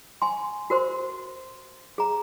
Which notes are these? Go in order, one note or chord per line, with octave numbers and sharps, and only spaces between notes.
G#5 C6
F#4 A#4 C5 C6
G#4 A#5